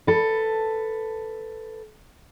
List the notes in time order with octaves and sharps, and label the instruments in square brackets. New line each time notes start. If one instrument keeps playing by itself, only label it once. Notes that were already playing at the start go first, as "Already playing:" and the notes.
[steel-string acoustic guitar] A4 B4